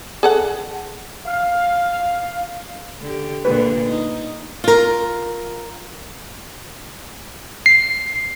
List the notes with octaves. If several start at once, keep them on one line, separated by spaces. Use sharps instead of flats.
G#4 A4 F#5
F5
D3 G4
A#2 D3 D4 B4
D#4
F4 A#4
C7